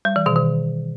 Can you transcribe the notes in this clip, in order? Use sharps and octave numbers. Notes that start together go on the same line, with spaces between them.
G3
E3
B2 D#3
D#3